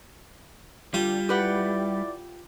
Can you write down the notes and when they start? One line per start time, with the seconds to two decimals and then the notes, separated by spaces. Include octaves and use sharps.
0.94 D3 G3 D4 F4 G4
1.29 E4 G4 B4 D5 F#5